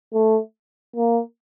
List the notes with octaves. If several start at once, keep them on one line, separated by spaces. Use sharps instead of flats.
A3
A#3